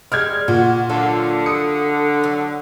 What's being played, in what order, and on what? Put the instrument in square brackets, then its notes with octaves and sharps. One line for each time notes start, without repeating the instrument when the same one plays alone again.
[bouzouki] G3 G#3 [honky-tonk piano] F6 G#6
[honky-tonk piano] A#2 [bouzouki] F#4
[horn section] D3 [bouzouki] F#3 F4 A4
[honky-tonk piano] D#6 C#7
[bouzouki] F#3